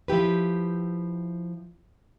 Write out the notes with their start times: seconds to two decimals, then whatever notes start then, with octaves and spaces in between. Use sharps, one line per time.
0.08 F3 E4 G4 B4